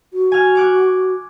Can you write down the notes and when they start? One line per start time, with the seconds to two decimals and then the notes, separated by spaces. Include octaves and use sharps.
0.13 F#4
0.32 G#5 F6
0.55 C#6 D6 F#6